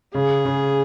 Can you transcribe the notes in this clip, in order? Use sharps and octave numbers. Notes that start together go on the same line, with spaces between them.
C#3 G#4
C#3